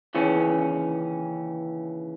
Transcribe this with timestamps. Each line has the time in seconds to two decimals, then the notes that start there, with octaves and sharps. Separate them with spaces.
0.14 D#2 C#3 E3 C#4